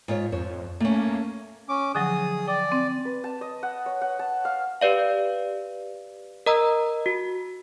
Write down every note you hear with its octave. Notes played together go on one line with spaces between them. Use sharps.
G#2 F4 C#5
F2 C5 C#5
A3 A#3 C#4
C#4 D6
D3 F3 F#3 G#4 D#6
D5 G5
C4
B4
A5
D#5
F#5
C#5
F#5
A5
F5
G4 B4 D5 F5
A#4 D#5 A#5 D#6 E6
F#4